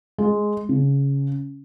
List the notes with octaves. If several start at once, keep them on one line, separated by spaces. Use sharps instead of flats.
G#3
C#3